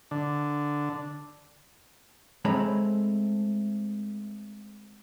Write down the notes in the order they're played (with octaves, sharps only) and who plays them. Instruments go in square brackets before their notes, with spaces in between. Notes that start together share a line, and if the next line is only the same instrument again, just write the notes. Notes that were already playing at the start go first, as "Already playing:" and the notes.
[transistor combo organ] D3
[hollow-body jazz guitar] G#3 A3 C4 C#5 A#5 B5